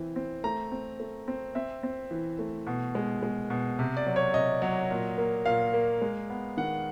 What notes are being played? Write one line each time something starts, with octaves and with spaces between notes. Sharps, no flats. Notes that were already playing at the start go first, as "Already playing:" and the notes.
Already playing: E3 C4
C4
A3 A#5
C4
A3
C4
C4 E5
C4
E3
A3
B2
G#3
G#3
B2
C3
D5
F#3
C#5
C3 D#5
F#3
A#2
A#3
A#2 F5
A#3
G#3
B3
D#3 F#5